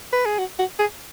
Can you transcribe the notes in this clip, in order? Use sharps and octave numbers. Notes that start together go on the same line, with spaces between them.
B4
G#4
F#4
F#4
G#4